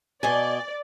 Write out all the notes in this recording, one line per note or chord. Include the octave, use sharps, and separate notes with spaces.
B2 D5 D#5 G#5